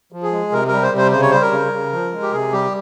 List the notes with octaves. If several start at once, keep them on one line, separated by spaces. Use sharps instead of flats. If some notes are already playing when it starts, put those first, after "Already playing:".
F3
G#4
G#3
C3 A#4
G3 A#4
C5
C3 C5
C#3 C5
C#5
G3 C5
A#4
C#3
C#3
F3
G#3
G4
C3 G#4
G3 G4